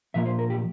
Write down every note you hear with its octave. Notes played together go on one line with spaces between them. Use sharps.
A#2 F3 A#3 E5
C5
A#4
G4